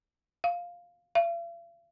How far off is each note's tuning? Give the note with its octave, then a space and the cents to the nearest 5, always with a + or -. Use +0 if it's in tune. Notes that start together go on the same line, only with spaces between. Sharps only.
F5 +5
F5 -45